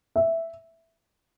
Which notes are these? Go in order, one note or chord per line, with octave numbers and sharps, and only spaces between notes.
E5